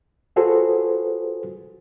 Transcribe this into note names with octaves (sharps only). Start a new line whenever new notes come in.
F4 F#4 G#4 A4 B4 C5